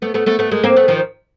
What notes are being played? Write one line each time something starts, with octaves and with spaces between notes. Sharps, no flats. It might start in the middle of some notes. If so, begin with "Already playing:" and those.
A3 B3
A3 B3
A3 B3
A3 B3
G#3 A#3
A#3 C4
A3 B3
D#3 F3